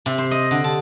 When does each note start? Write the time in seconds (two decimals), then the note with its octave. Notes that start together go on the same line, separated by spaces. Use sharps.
0.06 C3
0.18 C5
0.31 D#5
0.51 D3
0.64 A5